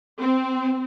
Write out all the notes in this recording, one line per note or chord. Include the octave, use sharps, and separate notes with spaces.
C4